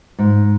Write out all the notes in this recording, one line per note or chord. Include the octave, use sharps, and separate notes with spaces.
G#2